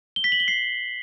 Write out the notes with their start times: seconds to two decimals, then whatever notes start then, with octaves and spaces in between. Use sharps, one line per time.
0.16 G7
0.24 B6
0.32 F#7
0.40 G7
0.48 C7